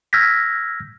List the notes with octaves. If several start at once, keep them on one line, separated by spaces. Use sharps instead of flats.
E6 F6 G6 G#6 A#6 B6